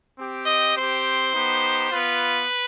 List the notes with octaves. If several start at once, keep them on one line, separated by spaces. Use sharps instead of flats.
C4 G4
D#5
C4 G4 C5
B3 D#4 G4
B3 F4 B4